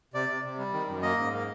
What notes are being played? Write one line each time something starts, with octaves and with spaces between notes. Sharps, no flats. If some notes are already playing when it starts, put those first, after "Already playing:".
C3 D5
C3
C3
G3
D#3
F#2
A#3 D#5
G#2
A#3